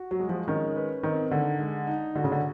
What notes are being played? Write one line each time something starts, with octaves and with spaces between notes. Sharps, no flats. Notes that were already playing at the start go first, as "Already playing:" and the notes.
Already playing: F#4
F#3
G#3
F3
D#3 C#4
B4
D#3 C4
D3 D#3
G#3
D#4
D3 F#4
C#3
D3